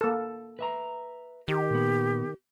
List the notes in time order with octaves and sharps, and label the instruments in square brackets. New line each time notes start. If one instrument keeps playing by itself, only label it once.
[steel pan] A#3 A4
[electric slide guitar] B4 E5 A#5
[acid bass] D#3 [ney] G4
[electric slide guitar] A#2 B3